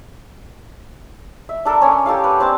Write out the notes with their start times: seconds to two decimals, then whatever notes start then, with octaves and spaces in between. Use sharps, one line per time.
1.49 E5
1.65 D4 A4 A#4
1.81 C#4 C#5 G#5
2.06 G4 A4 A#4 F5
2.24 B4
2.40 C4 D4 A5